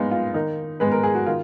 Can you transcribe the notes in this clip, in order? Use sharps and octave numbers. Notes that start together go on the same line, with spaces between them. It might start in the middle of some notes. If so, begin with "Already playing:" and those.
Already playing: A#2 G#3 B3 D#4 F4
F4
D#3 D#4
G#3 B3 B4
A#4
G#4
F#4
D#3 F4